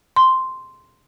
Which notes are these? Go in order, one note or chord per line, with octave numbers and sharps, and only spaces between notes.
C6